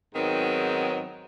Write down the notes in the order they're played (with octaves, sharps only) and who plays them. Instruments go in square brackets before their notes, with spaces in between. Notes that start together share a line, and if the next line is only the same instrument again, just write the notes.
[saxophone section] G#2 D#3 F#3 B3 C4 D#4